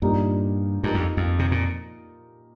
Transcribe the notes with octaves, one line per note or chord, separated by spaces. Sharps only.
G2 A#2 G3 D#4 G4 A#4
G2 F3 D#4 G4 A#4
F2
F2
C3
A#2